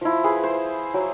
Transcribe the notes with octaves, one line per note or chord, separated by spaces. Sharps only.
F3 E4
G#4 B4
C5
F#3